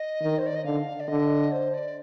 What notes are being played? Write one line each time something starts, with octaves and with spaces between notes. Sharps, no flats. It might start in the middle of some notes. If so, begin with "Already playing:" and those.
Already playing: D#5
D#3
C5
D5
D#5
D3 F5
D5
D3 D#5
C5
D5